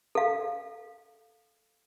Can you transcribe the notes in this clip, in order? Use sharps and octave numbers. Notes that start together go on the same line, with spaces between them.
A4 F5